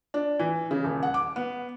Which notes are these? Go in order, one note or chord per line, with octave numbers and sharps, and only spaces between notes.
D4
E3
C#3
D#1
F#5
D6
B3